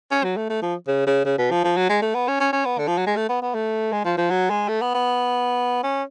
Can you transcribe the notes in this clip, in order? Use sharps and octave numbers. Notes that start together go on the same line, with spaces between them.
C#4
F#3
A3
A3
F3
C#3
C#3
C#3
B2
F3
F3
F#3
G#3
A3
B3
C#4
C#4
C#4
B3
D3
F3
F#3
G#3
A3
B3
B3
A3
G#3
F3
F3
F#3
G#3
A3
B3
B3
C#4